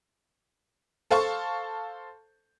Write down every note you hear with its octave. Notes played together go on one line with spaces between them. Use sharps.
A4 C5 F5 A5 C#6